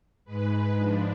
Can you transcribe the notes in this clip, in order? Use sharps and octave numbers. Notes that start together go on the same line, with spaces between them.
G#2 G#3 B4
G#2 F3 G#3 D4